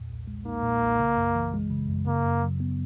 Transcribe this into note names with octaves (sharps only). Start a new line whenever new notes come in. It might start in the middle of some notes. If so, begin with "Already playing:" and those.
Already playing: E2 A#2
B1
G#3
A#3 D#4
A#2
B1
C#3
F#2
E3
G#3
C#3
F#2
C#3 A#3
F#2
F#3
B3